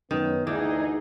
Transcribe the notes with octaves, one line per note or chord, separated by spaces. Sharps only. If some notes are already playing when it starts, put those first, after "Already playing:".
F#2 D#3 B3 C#4 D#4 B4
D2 E3 D#4 G#4 D6 G6 G#6